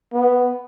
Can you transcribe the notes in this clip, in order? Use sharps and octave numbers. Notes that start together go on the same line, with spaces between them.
B3